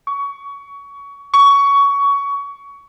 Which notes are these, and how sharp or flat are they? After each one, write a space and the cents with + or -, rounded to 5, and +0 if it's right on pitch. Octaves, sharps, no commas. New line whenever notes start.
C#6 +25
C#6 +20